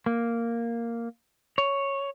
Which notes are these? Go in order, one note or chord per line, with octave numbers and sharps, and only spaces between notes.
A#3
C#5